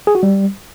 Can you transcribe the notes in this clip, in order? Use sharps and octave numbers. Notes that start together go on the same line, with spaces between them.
G#4
F#4
G3